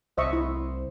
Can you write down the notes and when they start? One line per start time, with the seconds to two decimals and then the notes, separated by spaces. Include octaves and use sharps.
0.18 C2 C5 D#5 E5 C#6
0.33 E4